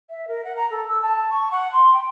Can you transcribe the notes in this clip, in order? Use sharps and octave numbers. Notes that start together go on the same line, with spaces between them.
E5
A#4
F#5
A#5
A4
E6
A5
C#6
F#5
C6
G5